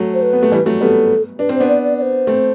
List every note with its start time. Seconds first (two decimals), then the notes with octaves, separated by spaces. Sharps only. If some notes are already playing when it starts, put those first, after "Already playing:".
Already playing: F#3 A3
0.14 C5
0.22 B4
0.33 B3
0.43 A3
0.52 E3 G3
0.66 F#3 A3
0.81 G3 B3 A4
1.39 D4 B4
1.49 C4
1.55 C5
1.60 B3 D4
1.69 D5
1.84 D5
1.98 D5
2.02 C5
2.27 A3 C4